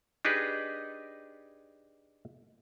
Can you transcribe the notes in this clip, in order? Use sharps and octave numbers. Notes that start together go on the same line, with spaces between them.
D4 D#4 G4 G#4 B4